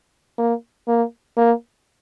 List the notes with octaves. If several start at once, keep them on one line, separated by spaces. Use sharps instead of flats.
A#3
A#3
A#3